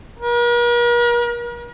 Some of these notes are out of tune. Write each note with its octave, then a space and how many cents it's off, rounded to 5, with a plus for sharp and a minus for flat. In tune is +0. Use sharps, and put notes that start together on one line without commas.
A#4 +45